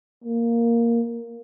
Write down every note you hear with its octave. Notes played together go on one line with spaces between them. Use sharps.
A#3